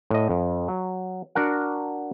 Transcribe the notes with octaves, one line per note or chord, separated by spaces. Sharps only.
A2 D#5
F2
F#3
D4 F#4 A#4 F#5